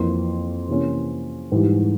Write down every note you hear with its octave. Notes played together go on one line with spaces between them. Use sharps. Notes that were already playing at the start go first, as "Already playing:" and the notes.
Already playing: F2 E3 A#3 C6
C3 E3 A#3 C#4
G#2 E3 G3